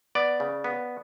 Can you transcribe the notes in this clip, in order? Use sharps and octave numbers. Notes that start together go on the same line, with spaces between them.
B3 D5
C#3
B3